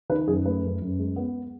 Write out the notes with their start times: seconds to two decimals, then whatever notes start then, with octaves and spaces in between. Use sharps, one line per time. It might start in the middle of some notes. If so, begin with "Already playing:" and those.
0.10 D#3 B4
0.28 F#2 G#4
0.45 A3 B4
0.64 F#2
0.82 F#2
0.99 G#3
1.16 B3